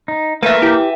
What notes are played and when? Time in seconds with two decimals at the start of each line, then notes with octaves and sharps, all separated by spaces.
0.08 D#4
0.43 A3 A#3 A#4 B4 E5
0.62 E4 G4